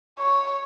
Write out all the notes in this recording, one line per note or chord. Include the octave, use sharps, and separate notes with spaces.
C#5